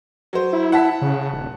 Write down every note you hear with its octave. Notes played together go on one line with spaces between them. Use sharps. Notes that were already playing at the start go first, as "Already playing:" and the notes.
F#3 C5
E4
F#5 A5 B6
C#3
D#1